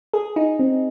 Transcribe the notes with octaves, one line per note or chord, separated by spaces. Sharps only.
G#4
D#4
C4